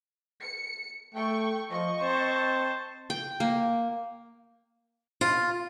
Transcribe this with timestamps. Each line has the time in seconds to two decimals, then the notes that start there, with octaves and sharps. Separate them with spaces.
0.43 C#7
1.15 A3 G5 C#6
1.71 F3 D#5 C#6
2.01 C4 C5 A5
3.10 G5
3.40 A#3
5.21 F4